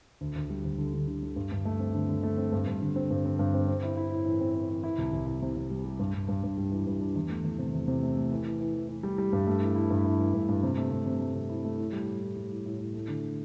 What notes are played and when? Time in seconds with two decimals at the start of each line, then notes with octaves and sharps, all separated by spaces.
0.21 D2
0.36 D2
0.50 G3
0.64 D2
0.78 D3
0.93 D3
1.07 D3
1.23 D3
1.36 G2
1.52 G2
1.65 A3
1.80 C4
1.94 D3
2.09 D3
2.23 A3
2.37 C4
2.52 G2
2.67 G2
2.81 D3
2.96 C4
3.10 G2
3.25 C4
3.39 G2
3.54 C4
3.68 C4
3.83 E4
3.97 E4
4.12 A2
4.25 E3
4.40 C4
4.54 C4
4.70 E3
4.84 E4
4.98 C2
5.12 C2
5.27 E4
5.42 C3
5.57 C3
5.70 G3
5.85 G3
5.99 G2
6.14 G2
6.28 G2
6.43 G2
6.58 G3
6.72 E3
6.87 G2
7.00 D4
7.15 E2
7.30 A3
7.44 E2
7.58 C3
7.74 E2
7.88 C3
8.03 A3
8.17 A3
8.31 E3
8.46 E3
8.61 E3
8.75 E3
8.89 E3
9.03 G3
9.18 G3
9.33 G2
9.47 A3
9.62 E3
9.76 E4
9.90 G2
10.04 E4
10.19 E3
10.34 G2
10.49 G2
10.63 C3
10.78 A3
10.91 C3
11.06 C3
11.21 A3
11.35 C3
11.49 E4
11.65 A3
11.78 A2
11.92 G3
12.07 A2
12.22 A2
12.37 G3
12.52 A2
12.66 A2
12.80 A2
12.94 A3
13.08 D3